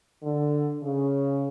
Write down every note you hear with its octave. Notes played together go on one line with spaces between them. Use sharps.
D3
C#3